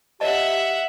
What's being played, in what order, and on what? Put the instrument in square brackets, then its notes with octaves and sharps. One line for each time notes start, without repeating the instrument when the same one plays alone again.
[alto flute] G4 [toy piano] C#5 D#5 A5 [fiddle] E5 F#5